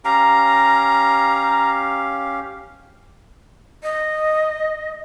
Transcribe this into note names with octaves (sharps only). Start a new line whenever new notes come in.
C#4 G4 F5 A#5
D#5